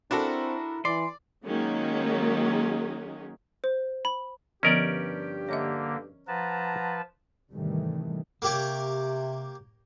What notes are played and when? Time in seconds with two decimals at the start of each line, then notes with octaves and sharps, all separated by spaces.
0.11 C4 D4 E4 F#4 A4 A#4
0.85 E3 D5 C6
1.45 D#3 F#3 G#3 A#3 C#4 G#4
3.64 C5
4.05 B5
4.63 G2 D3 F3 B3 C#4 G4 A#4 D5
5.49 D3 A#3 C#5 D#5 E5
6.28 F3 B4 F#5 A5 A#5
7.52 G#2 C3 D#3 E3 G3 A3
8.42 C3 A#3 G4 C#5